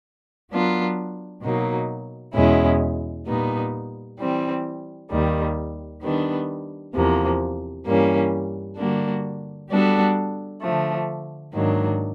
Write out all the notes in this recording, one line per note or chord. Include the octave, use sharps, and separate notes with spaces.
F#3 B3 D4 F4 A#4
B2 F#3 A#3 D#4
E2 B2 G#3 C#4 E4
A#2 G3 B3 D#4
E3 G3 C4
D#2 D#3 G3
D#3 G3 B3 D4
E2 C3 F3 A#3
G2 E3 G3 A#3 C#4
D3 G3 A#3 D4 F#4
G3 B3 D4 F#4 A4
D3 F3 A3
G#2 D#3 F#3 A#3 D4